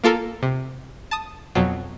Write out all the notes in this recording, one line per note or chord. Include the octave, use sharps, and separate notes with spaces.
A#3 F4 A4 A#4
C3
A5 D#6
F2 B2 F#3